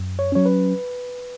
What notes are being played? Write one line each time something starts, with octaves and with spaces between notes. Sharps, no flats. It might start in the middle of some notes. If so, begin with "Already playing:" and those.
Already playing: F#2
C#5
F#3 C#4 C#5
B4